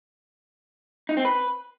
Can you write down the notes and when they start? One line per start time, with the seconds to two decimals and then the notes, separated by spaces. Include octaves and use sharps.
1.09 D#4
1.17 C4
1.25 B4